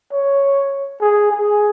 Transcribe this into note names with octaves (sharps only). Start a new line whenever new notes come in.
C#5
G#4
G#4